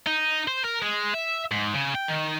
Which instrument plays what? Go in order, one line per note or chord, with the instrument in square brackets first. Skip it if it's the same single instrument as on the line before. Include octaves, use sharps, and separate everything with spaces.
[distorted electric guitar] D#4
C5
A#4
G#3
E5
G#2
C#3
G5
D#3